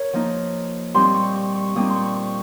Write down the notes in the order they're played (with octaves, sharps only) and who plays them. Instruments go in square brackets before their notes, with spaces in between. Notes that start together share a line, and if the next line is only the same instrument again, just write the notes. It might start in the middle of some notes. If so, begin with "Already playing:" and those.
Already playing: [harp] A#4 C#5
F3 A#3 D#4
A#2 G3 C4 D#4 C6
C#6
C#6
C#6
A#2 G3 C4 D#4 D#6
C6
C#6
C#6